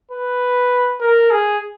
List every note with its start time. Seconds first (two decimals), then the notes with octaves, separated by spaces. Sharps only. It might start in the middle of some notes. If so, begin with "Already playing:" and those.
0.11 B4
1.01 A#4
1.30 G#4